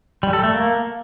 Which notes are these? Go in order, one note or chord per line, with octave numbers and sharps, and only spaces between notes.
G3
A4
A3
A#3